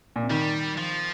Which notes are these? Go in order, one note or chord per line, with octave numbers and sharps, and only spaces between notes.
A#2
C3
D#3 G3
F3